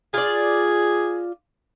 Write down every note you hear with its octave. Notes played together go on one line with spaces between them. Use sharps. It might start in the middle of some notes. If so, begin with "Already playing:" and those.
F4 G#4 D5